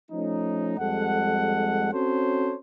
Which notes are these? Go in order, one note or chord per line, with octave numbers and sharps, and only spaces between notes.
F3 A3 C#4 D#4
F2 G3 G#3 A4 F#5
C4 C#4 F#4 A4 C5 C#5